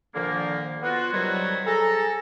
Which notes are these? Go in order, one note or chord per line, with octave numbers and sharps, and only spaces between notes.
A#2 D3 D#3 F3 A#3
B3 F4 F#4
C3 D#3 F#3 G3 F#4 C#5
G#4 A4 A#5